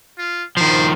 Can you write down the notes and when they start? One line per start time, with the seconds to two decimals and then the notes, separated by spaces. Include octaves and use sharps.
0.18 F4
0.57 D#3 F3 C5